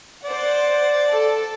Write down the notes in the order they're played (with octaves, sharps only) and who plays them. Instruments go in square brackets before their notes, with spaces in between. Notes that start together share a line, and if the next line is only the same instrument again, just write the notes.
[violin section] C5 F#5 [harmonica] D5
[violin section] A4 A5